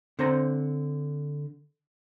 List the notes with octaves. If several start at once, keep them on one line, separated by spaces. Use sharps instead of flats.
D3 C4 C5 A#5